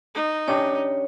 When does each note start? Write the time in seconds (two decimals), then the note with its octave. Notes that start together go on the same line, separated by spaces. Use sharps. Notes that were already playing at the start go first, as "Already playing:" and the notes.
0.15 D#4
0.48 C#4 D4 G4 C#5